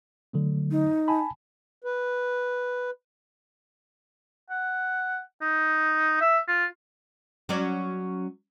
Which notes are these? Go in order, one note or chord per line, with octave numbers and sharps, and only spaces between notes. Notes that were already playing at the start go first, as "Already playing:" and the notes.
D3 F#3 A3
D#4
G#5 A5 B5
B4
F#5
D#4
E5
F4
F#3 C#4 D5